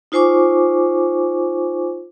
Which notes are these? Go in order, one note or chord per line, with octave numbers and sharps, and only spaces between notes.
D#4 F4 C5 G#5 C#6 D6